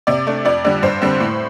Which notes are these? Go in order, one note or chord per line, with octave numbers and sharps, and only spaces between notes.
C3 D5
A3 D4
F2 D5
D3 G3 D5
G2 C5
D3 G3 C4
A2